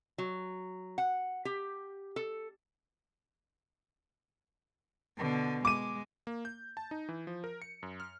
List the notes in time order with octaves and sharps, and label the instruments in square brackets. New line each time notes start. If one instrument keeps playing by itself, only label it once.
[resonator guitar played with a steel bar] F#3
F#5
G4
A4
[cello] B2 D3
[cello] G#3 [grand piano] D6 D#7
[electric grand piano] A#3
G6
A5
D#4
E3
F3
A#4
C#7
F#2
F6